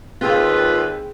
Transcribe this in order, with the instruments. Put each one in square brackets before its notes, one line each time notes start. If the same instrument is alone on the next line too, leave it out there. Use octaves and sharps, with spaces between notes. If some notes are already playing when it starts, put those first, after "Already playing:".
[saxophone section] D#2 B4 [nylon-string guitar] C4 G#4 F5 [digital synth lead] F4